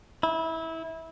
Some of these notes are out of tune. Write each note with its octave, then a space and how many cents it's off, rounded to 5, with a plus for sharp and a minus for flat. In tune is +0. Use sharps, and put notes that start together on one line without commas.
E4 -20